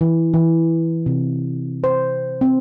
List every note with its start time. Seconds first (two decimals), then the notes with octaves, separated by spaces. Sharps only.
0.01 E3
0.34 E3
1.06 C3
1.84 C5
2.41 C4